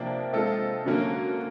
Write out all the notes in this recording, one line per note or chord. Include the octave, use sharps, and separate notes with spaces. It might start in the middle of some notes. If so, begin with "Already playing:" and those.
Already playing: C3 F3 A#3 D4
G#3 C4 F4 A4
D3 F#3 A#3 C#4